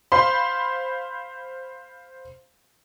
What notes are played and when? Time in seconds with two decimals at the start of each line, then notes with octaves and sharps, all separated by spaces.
0.12 C5 F5 B5 C6